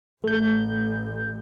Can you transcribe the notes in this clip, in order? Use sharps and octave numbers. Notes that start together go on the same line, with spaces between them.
A1 A3 G6